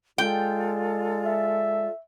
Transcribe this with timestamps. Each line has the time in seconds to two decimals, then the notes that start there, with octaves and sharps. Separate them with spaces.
0.18 G#3 F4 A4 D5 G5
1.26 E5